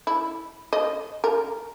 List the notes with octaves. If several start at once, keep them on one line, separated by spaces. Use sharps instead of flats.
E4
D#5
A#4